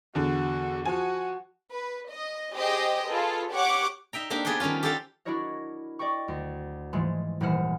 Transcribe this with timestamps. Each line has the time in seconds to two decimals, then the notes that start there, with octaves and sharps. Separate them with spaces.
0.15 E2 D3 F#4
0.86 F3 F#4 G#5
1.72 B4
2.10 D#5
2.55 G4 G#4 C5 D#5 G5
3.08 F4 G#4 A4 B4
3.52 G4 C#5 F#5 C#6 D6
4.13 D#4 E5 G5 A#5
4.30 A#3 C4 D4 D#4 G4
4.45 B3 G#4 D5 F#5 G5
4.60 D#3 F3 G3 C#4 F4
4.83 G4 A4 C5 D5 F5 F#5
5.25 D4 E4 F#4 A#4 C#5 D#5
5.99 D5 D#5 G5 C#6
6.28 D2
6.93 G#2 E3 F3 G#3 A3
7.41 D#1 E3 C5 F#5 F6